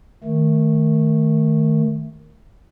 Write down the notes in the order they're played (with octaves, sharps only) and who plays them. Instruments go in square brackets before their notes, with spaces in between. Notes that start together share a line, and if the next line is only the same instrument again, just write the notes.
[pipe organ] D#3 A3